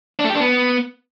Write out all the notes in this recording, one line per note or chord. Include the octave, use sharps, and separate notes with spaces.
D4
A3
G4
D4
B3